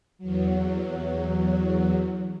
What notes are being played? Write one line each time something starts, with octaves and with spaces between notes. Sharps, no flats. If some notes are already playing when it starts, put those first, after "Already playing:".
E2 F#3